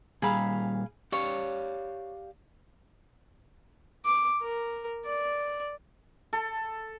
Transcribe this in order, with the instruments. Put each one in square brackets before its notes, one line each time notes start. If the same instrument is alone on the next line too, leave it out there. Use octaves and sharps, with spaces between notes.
[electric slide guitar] A#2 G3 A#5 [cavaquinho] G#4 F5 B5
[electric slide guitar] G4 D5 F5 [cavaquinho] C#5
[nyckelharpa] D6
A#4
D5
[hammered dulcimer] A4